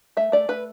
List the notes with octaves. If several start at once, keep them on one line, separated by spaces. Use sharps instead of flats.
A3 E5
A3 D5
A3 B4